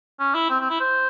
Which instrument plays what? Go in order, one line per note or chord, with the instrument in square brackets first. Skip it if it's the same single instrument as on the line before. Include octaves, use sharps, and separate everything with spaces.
[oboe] C#4
E4
C4
C4
E4
C5